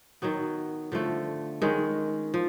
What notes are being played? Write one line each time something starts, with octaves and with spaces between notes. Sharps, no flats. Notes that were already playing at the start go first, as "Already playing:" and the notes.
D#3 F#3 B3
D3 F3 A3
D#3 G#3 C#4
F3